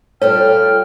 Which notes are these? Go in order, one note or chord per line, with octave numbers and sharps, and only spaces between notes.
G3 F4 A4 C#5 G5 F6